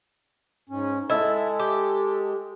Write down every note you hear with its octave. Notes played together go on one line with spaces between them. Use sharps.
G#2 C#4
G#3 E4 A4 D#5 E6
G4